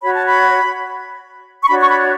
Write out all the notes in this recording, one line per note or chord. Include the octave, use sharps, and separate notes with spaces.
F#4 C#5 B5
A5
B5
C#6
D4 F#4 C#5 B5
C#6
B5